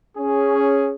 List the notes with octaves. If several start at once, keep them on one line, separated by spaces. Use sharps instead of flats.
C#4 G#4